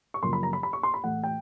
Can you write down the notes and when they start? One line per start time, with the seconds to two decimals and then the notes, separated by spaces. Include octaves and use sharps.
0.14 C#6
0.23 F#2 C#3 F3 A#3 C6
0.33 B5
0.43 A#5
0.53 B5
0.63 B5
0.73 C#6
0.83 C6
0.94 B5
1.04 A2 E3 A3 F#5
1.23 G5